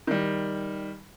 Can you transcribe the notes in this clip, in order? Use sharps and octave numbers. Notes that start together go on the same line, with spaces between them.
D#3 G3